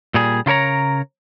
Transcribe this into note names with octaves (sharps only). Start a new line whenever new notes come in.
A#2 G3 G#4
C#3 F4 A#4 C#5 A#5